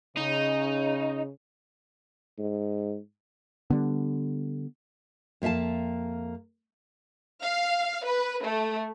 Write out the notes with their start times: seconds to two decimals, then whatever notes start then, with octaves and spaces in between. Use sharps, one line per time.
0.17 C#3 D#4
2.39 G#2
3.70 D3 G3 B3
5.42 F2 A#3 E5 F5 A5
7.42 F5
8.04 B4
8.43 A3